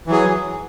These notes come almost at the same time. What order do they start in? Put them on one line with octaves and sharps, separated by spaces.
E3 F#3 G#4